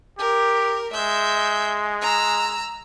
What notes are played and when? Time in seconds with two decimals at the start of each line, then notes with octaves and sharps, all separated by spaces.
0.19 G4 A#4
0.93 G#3 E5 G6
2.02 A#5 E6